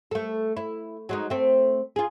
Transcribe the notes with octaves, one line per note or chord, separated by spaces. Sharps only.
A3 A4
E4
F#3 G#3 D#4
A3 C4
F4 G#4